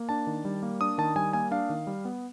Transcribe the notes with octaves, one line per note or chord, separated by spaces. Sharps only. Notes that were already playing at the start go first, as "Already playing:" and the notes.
Already playing: A#3
D4 A5
D#3
G3
A#3
D4 D#6
D#3 A5
G3 G#5
A#3 G#5
D4 F5
D#3
G3
B3